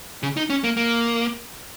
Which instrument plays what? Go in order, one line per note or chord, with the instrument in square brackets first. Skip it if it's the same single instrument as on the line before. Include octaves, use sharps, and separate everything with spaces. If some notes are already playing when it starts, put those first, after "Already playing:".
[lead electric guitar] C#3
D#4
C#4
A#3
A#3